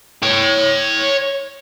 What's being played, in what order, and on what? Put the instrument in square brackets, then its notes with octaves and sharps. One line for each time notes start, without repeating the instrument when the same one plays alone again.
[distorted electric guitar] C#5 G5